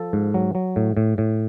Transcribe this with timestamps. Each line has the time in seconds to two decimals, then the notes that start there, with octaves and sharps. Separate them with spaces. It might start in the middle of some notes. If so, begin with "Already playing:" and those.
Already playing: F3 A4
0.13 G#2
0.34 F#3
0.55 F#3
0.76 A2
0.97 A2
1.18 A2